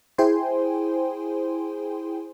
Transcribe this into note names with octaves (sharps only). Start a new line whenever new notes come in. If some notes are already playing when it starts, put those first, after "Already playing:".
E4 G#4 C5 G5 G#5 C6